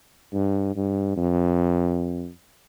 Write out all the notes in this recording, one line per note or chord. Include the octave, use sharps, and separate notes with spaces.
G2
G2
F2